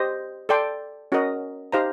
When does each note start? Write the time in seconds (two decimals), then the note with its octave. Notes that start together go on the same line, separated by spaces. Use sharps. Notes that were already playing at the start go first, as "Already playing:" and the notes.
Already playing: G4 C5 D#5
0.49 A4 D5 G5 C6
1.12 C#4 F#4 A#4 D#5
1.72 D#4 G4 C5 F5 A#5